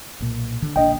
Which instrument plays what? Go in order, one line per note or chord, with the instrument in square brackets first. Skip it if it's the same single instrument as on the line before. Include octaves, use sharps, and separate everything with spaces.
[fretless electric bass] B1 A#2
D3
[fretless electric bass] A#1 A#2 D4 [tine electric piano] D#5 G5